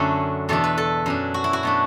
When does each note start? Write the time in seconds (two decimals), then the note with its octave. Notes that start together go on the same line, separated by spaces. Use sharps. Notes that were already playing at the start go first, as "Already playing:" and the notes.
Already playing: F#2 D3 F#3 A3 D4 E4 F#4
0.49 E2 B2 A3 D4 A4
0.64 B4
0.78 A4
1.06 F#2 F#3 D4
1.34 F#4
1.44 E4
1.53 F#4
1.63 B2 A3 D4